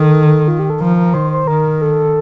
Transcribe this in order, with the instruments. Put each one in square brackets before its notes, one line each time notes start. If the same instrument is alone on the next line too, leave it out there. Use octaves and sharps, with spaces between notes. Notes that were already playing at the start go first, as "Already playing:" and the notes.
Already playing: [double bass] D#3 [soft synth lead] A4
[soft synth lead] F4
G4
A4
[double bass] F3 [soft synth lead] A#4
[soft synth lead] A#4
[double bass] D#3 [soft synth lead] C5
[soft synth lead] C5
[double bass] D#3 [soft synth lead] A#4
[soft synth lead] A4